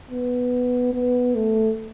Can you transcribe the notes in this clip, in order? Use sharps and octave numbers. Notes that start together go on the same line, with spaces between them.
B3
B3
A3